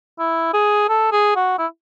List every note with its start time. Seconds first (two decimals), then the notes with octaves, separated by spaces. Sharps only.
0.19 E4
0.54 G#4
0.89 A4
1.12 G#4
1.36 F#4
1.59 E4